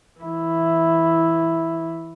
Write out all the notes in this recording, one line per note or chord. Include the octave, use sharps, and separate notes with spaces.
E3 E4